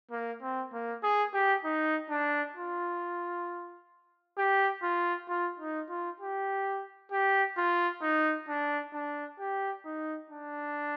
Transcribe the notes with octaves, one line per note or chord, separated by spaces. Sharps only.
A#3
C4
A#3
G#4
G4
D#4
D4
F4
G4
F4
F4
D#4
F4
G4
G4
F4
D#4
D4
D4
G4
D#4
D4